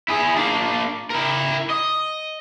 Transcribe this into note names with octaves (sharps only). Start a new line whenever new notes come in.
E4 G#4
A#3 D4
E4 A#4
D#5